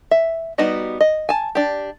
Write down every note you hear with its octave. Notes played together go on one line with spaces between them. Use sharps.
E5
G3 B3 D#4 F#4 D#5
D#5
G#5 A5
D4 G4